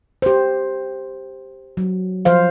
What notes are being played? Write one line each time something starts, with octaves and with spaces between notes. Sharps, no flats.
G4 C5
F#3
F3 C5 F5